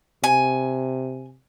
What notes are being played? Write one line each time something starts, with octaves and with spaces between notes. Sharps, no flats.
C3 G#5